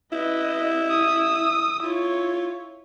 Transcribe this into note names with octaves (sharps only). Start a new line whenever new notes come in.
E4 B4 D#5
D#6 E6
E4 F4 C#5